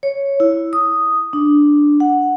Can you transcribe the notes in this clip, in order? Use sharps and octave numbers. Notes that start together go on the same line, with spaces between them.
C#5
E4
D#6
D4
F#5